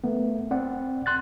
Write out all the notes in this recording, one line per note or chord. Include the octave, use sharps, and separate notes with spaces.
A3 B3
C4 D5 F#5
C6 F#6 A6